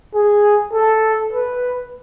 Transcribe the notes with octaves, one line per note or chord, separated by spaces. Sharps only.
G#4
A4
B4